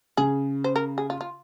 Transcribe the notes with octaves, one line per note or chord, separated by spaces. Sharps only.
C#3 G#4
C5
A#4
G#4
F4
F4